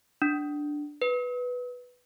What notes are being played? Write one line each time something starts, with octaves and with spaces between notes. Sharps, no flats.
D4
B4